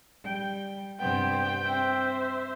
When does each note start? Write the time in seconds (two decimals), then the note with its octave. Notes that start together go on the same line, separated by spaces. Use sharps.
0.25 G3 G5
1.00 G2 C3 B3 C5 G5
1.65 C4 C5 E5